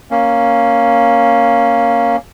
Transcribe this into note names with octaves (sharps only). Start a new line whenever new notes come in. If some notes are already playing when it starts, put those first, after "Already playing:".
A#3 C#4